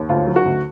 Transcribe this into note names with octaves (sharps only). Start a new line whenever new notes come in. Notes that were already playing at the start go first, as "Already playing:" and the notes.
Already playing: D#2
D2 F4
F#3
F#4
D2